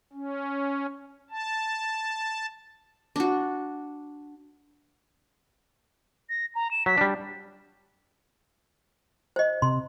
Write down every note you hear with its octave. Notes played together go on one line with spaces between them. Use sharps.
C#4
A5
D4 F#4
A#6
A#5
E7
F#3 B6
G3 D4
C5 D#5
C3 C6